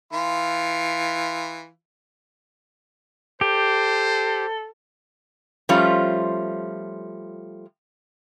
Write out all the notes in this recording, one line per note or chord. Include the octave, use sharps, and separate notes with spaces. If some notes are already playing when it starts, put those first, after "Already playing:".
E3 F4
G4 A4 C5
F3 G3 A3 C#4 F4